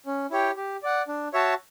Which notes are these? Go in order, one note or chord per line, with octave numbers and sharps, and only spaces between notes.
C#4
E4 G4 C#5 G5
G4
D5 F#5
D4
F#4 C#5 E5 A5